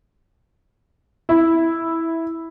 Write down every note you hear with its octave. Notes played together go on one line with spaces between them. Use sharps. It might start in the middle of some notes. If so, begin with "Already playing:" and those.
E4